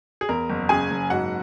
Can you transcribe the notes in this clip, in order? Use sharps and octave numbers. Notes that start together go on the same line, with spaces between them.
G#4
E2 A#4
F#1
C#3 G#4 G#5
F#1
G#2 F#4 F#5